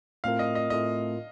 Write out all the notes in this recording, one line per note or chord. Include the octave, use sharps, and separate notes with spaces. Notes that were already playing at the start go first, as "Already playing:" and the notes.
A2 A3 C4 F4 A#4 F5
D#5
D#5
A2 A3 C4 F4 A#4 D#5